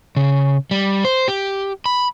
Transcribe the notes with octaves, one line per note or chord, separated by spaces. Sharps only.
C#3
G3
C5
G4
B5